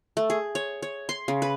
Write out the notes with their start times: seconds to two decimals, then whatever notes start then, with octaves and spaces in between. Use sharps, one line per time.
0.17 A3
0.30 G#4
0.55 C#5
0.82 C#5
1.09 C6
1.28 C#3
1.42 B4